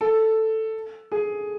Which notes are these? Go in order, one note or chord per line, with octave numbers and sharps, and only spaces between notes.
A4
G#4